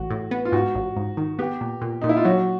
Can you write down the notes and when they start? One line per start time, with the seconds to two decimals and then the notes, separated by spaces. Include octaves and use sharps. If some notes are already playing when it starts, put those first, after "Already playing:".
Already playing: A1 F#4
0.10 A2
0.31 B3
0.45 F4
0.52 G#2 F#4
0.75 A1
0.96 G#2
1.17 D#3
1.39 B3 G4
1.61 A#2
1.81 A#2
2.02 A#2 D#4
2.09 E4
2.17 F4
2.25 F#3 F#4